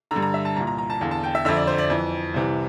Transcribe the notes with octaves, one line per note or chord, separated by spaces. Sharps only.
D3 A#5
G2
A#5
E5
A5
C2 A#2 A#5
A#5
A#5
A5
E2 D3 F5
A5
G5
E5
F2 D3 E5
D5
C5
D5
F2 E3
C2 C3 E3